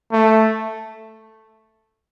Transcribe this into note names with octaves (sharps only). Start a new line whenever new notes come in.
A3